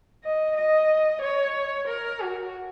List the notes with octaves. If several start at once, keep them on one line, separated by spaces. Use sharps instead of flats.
D#5
D#5
C#5
A#4
F#4